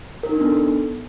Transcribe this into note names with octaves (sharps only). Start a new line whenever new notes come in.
A#4
D#4
D4
B3
A4